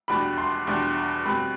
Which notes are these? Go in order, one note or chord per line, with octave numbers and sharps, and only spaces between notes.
E2 B2 G3 D4 B5
C6
E2 B2 G3 D4
B2 G3 C4 B5